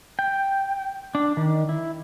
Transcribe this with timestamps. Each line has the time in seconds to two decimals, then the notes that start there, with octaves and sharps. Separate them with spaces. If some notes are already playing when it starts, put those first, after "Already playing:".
0.19 G5
1.15 D4
1.37 D#3
1.69 E4